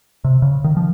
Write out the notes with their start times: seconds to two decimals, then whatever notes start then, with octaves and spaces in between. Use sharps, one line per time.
0.24 C3
0.42 C#3
0.64 D#3
0.77 F3